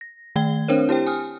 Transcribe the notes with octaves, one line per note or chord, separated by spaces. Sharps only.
A#6
D#3 A3 G5 G#6 G7
C4 D4 A#4 C5 C#5
E4 G4 C5 G5
G#5 D#6 F6